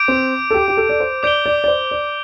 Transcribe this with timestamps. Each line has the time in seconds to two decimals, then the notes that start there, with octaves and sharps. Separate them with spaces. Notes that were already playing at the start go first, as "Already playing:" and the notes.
Already playing: D6 G6 D7
0.08 C4
0.50 A4
0.54 G4
0.68 G4
0.77 A4
0.89 D5
1.00 C5
1.23 D5 D6 G6 D7 G7
1.46 D5
1.64 D5
1.68 C5
1.91 D5